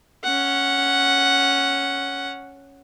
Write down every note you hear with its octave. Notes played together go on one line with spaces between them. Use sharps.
C#4 F#5